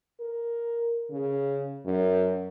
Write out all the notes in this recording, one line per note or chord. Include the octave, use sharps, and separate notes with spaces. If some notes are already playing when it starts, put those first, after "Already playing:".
A#4
C#3
F#2